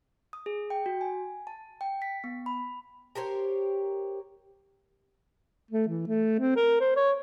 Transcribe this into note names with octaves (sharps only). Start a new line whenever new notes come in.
D#6
G#4
G5
F#4
G#5
A5
G5
B6
B3
B5
G4 A#4 C5 C#5
A3
E3
A3
C4
A#4
C5
C#5